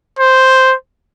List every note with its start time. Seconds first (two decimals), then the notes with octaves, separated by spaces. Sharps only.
0.19 C5